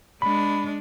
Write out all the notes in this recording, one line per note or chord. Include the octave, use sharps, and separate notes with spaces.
G#3 D4 B5